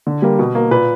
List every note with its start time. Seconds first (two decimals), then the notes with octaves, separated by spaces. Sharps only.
0.07 D3
0.22 G3 A#3
0.39 B2
0.55 A#3
0.71 A#2 B4